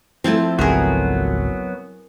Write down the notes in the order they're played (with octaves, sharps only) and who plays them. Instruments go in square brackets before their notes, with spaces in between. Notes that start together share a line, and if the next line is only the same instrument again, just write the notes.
[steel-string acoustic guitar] F3 A3 [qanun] C4 E4 A5
[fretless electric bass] G#1 C#2 C4 [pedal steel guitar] F#3 B3 F#4 [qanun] G#4 A#4